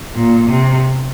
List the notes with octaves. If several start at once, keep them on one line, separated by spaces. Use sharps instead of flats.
A#2
C3